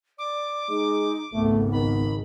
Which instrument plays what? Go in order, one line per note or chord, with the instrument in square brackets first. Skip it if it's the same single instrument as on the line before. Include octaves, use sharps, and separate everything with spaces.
[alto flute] D5 [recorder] D6
[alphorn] G#3 [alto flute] D#4
[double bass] G#1 C#2 [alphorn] A3 [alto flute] B3
[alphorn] D#3 [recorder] B5